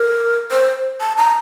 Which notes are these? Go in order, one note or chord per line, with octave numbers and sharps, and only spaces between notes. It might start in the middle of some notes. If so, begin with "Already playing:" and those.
Already playing: A#4
C5
A5
A#5